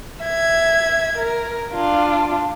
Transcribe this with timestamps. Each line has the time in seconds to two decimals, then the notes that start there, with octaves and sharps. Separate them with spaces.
0.22 E5 G#6
1.17 A#4
1.73 D4 F4